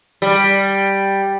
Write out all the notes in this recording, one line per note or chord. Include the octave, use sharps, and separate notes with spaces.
G3